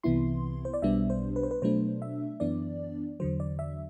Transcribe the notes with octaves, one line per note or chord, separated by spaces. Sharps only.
C2 C3 E3 B3 E4 C6
C5
D5
B1 B2 G3 B3 D4 E5
C5
B4
C5
B4
B2 F#3 A3 D4 C5
E5
F#2 E3 B3 D4 D5
E2 D3 F#3 C5
D5
E5